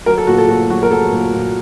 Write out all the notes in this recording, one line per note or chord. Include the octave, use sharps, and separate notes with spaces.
F#3 A#4
A4
A#2 F#4
A4
A#2 F#4
F#3 F#4
A#4
F#3 A4
A#2
A#2